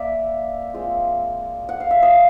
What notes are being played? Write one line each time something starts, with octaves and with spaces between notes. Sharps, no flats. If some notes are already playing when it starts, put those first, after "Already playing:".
Already playing: A#3 D5 E5
G#3 C4 F4
F#5
F5
E5
D#5 F5